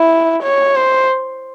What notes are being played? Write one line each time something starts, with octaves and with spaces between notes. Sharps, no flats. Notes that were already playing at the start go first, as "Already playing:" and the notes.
Already playing: E4
C#5
C5